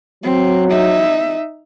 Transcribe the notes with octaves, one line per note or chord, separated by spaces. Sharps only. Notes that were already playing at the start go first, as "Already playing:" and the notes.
F#3 C4
D#4 E5